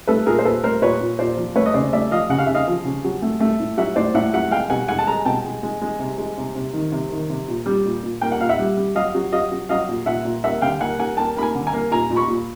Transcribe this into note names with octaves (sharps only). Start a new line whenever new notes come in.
A3 A4 B4
A#2 G#4 A#4
C5
A#2 A4 B4
A3 A#4 C5
A#2 B4 C#5
A#2
A#2 C5 D5
F3
A3 B4 C#5
D#5
C#3 C5 D5
A3 D5 E5
F3 D#5 F5
C#3 F#5
F5
C#3 E5
D#5 F5
F3
C#3
F#3
A3
A3
A2
F#3 E5 F#5
A2 C5 D5
A2 E5 F#5
F#3 E5 F#5
G#3 F5 G5
B2 F#5 G#5
G#3 F#5 G#5
A5
G#3 G#5 A#5
B2 G5 A5
G#3
G#3
G#3
C3
G#3
C3
C3
D#3
C3
D#3
C3
A#2
G3
A#2
A#2
A#3 G5
F#5
A#2 F5
E5 F#5
G3
G3
F#3 D#5 F5
F#3
F#3 D#5 F5
F#3
F#3 D#5 F5
A#2
A#2 E5 F#5
A#2
A#3 E5 F#5
D3 F5 G5
A#3 F#5 G#5
A#3 F#5 G#5
A#3 G5 A5
A#3 B5
G#5 A#5
D3
G#5 A#5
A#3
A#2 G#5 A#5
A#2
B5 C#6
A#2